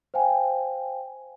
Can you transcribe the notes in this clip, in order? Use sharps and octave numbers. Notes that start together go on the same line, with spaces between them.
C5 F5 G5 G#5